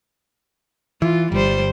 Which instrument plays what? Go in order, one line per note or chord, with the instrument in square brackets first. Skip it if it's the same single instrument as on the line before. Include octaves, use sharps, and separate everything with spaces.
[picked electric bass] E3 [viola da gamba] F4
[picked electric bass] G1 [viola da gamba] G3 C5